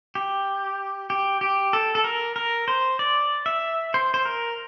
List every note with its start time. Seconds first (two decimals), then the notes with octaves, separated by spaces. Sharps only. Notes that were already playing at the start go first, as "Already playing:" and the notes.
0.15 G4
1.10 G4
1.41 G4
1.73 A4
1.95 A4
2.04 A#4
2.36 A#4
2.68 C5
2.99 D5
3.46 E5
3.94 C5
4.14 C5
4.25 A#4